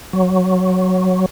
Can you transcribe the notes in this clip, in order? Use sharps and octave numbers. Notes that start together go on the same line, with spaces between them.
F#3